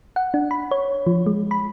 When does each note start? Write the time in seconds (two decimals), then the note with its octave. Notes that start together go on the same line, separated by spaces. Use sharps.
0.16 F#5
0.34 D4
0.51 B5
0.71 C#5
1.07 F3
1.26 G#3
1.51 B5